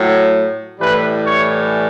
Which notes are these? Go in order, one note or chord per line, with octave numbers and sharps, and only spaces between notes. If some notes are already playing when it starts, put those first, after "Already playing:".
Already playing: A2 F#3
A2 E3 G3 B4
C#5